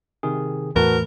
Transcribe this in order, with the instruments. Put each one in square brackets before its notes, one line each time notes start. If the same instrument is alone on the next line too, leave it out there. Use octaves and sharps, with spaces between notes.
[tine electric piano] C3 D#3 G#4
[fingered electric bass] E2 A2 [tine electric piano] F#4 B4 A5 [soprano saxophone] A#4